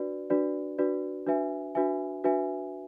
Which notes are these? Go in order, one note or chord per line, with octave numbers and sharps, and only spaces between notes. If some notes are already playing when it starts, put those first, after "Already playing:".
Already playing: D4 F#4 B4 D5
D4 F#4 B4 D5
D4 F#4 B4 D5
D4 F#4 B4 E5 G#5
D4 F#4 B4 E5 G#5
D4 F#4 B4 E5 G#5